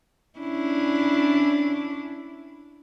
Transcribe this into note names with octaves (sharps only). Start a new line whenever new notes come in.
C#4 D4 E4